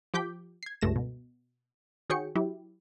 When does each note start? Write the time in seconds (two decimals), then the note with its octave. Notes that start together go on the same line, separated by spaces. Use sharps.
0.14 F3 G4 D6 G6 B6
0.63 G#6 C7
0.81 C#2 G2 A3 A#6 E7
0.96 B2
2.10 D#3 F#4 G#4 C#5 G5 C#7
2.35 F#3 E4 G4